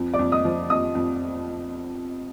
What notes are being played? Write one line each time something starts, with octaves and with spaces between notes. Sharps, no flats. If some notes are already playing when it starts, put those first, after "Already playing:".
Already playing: F2
D5 D6
F2
D#5 D#6
F3
F2 D#5 D#6
F2